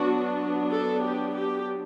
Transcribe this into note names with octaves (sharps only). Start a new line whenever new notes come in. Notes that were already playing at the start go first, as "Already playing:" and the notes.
Already playing: F#3 B3 D4 F#4
A4
G4
G4